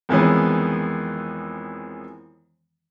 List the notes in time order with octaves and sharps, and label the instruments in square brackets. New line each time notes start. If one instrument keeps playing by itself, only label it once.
[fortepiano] F2 D#3 E3 G#3 B3 C#4